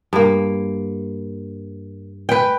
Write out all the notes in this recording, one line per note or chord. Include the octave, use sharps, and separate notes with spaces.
G2 A#3
B4 G5